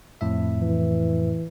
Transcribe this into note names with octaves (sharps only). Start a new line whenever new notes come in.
F2 A2 E5
E3